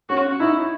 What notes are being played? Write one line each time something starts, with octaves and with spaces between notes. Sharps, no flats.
C#4 F#4
D#4 E4